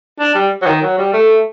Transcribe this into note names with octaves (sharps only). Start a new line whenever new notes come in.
D4
G3
F#3
D#3
F#3
G3
A3